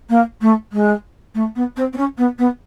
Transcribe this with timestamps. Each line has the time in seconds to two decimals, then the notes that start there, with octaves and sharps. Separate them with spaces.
0.09 A#3
0.41 A3
0.72 G#3
1.34 A3
1.55 B3
1.76 C4
1.92 C4
1.97 C#4
2.17 B3
2.38 B3